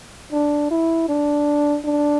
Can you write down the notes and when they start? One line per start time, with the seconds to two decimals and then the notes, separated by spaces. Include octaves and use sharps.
0.33 D4
0.71 E4
1.09 D4
1.85 D4